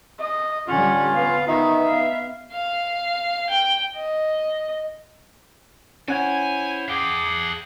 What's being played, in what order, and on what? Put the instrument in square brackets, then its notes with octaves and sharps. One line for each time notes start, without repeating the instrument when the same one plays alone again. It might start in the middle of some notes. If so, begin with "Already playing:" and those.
[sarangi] D#5
[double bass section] D3 G3 [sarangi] C#4 [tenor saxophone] F4 [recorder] F#5
[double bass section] B3 [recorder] F5
[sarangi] D#3 [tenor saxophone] D#4 [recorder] E5
[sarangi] F5
[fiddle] F5
G5
D#5
[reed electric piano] C#4 F#5 G#6 [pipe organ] E4 C5 C#5 [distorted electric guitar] G#5
[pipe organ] G#4 D6 [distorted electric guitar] F5 G5